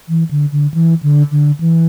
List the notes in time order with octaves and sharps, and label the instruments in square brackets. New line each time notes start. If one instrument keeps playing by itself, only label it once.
[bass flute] E3
D3
D3
E3
D3
D3
E3